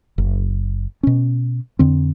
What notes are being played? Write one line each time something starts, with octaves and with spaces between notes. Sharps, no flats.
F#1
B2 C#4
F2 D3 C4